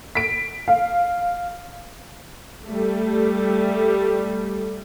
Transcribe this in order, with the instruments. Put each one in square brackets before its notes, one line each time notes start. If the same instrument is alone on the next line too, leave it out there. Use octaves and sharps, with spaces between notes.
[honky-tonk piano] B6 D7
F5
[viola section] G3 A3